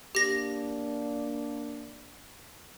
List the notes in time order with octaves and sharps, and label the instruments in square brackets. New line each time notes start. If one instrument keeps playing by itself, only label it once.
[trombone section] A#3 D4 [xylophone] G4 A#6